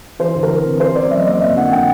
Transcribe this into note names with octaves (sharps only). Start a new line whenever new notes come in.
E3 C5
D2 B4
A#4
E3 B4
C3
C#4 C5
C#4 D5
F#3 E5
D#5
A#3 D5
D#5
F2 E5
D3 F#5
D3 G5